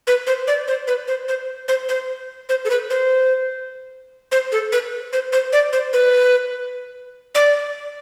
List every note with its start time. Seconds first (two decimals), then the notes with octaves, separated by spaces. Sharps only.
0.07 B4
0.27 C5
0.48 D5
0.68 C5
0.88 B4
1.08 C5
1.28 C5
1.68 C5
1.89 C5
2.49 C5
2.65 A4
2.70 B4
2.90 C5
4.32 C5
4.52 A4
4.72 B4
5.13 C5
5.33 C5
5.53 D5
5.73 C5
5.93 B4
7.35 D5